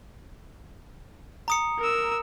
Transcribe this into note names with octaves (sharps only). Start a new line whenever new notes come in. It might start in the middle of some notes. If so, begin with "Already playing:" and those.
A#5 D#6 C#7
A#4 E6